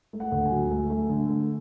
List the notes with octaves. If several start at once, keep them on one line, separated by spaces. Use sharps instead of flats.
A3
F#5
D2
G#5
F#3
A3
A3
D3
A3